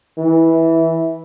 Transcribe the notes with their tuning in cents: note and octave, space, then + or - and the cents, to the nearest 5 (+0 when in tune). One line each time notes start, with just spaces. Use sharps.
E3 -10